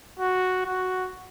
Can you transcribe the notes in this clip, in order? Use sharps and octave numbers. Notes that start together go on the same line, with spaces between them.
F#4
F#4